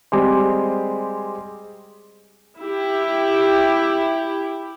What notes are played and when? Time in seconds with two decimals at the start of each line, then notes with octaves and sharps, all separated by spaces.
0.12 G3 G#3 C4 G4 G#4 C5
2.60 E4 G4